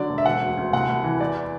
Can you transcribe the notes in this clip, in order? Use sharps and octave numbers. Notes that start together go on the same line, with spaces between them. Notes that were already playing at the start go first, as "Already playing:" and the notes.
Already playing: D3 F#3 D5
E1
E5
E1 F#5
D2
D2
C2 F#5
C2
E3
E2 D5